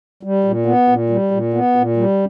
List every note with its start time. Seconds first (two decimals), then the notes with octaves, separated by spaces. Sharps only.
0.23 G3
0.44 A#2
0.66 B3
0.88 A#2
1.10 G3
1.31 A#2
1.54 B3
1.76 A#2
1.96 G3